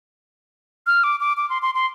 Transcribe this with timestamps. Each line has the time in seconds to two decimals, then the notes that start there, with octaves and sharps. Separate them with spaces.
0.87 F6
1.04 D6
1.20 D6
1.37 D6
1.50 C6
1.62 C6
1.75 C6